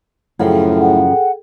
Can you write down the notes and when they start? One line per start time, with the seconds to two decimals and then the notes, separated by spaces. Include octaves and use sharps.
0.39 F#2 A2 C#3 F3 G#4 A4 G5
0.80 F#5